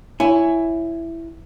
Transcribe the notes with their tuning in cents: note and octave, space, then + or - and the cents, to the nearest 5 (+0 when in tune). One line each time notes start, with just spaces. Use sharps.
E4 +10 C#5 +15 G#5 +0